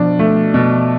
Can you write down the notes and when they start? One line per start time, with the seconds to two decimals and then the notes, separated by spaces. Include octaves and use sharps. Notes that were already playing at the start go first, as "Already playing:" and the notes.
Already playing: B2 F3 D4
0.19 A3
0.54 B2